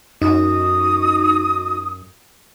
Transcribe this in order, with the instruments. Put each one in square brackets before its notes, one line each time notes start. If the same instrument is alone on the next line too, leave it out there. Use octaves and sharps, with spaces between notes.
[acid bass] F#2 [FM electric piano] D#4 [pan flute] F#4 [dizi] D#6